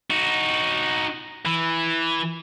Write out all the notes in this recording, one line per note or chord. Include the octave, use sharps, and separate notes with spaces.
D#4 F#4
E3